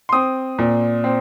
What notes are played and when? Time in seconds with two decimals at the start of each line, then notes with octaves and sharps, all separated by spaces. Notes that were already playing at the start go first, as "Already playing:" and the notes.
0.09 C6
0.12 C4 D#6
0.58 A#2
1.04 C4